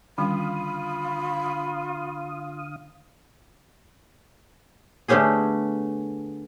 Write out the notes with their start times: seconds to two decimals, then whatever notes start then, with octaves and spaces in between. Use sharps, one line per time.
0.18 D3 D#3 G3 C#4 F4 F5 B5 D#6
5.08 D3 A3 B3 C#4 G4 G#4